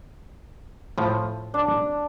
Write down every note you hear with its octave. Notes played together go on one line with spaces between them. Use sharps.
A2 F3
D4